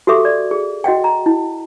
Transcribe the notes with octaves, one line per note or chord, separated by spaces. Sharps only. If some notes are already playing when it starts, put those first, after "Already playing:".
F#4 G4 A4 E5 D6
D5
G#4
F#4 D#5 F#5 G5
A#5
E4